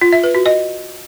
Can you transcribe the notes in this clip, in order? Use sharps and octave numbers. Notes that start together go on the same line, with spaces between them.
F4
E5
B4
F#4
D#5